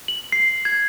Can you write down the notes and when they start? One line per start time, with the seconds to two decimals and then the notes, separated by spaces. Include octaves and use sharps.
0.08 F#7
0.32 C7
0.65 G#6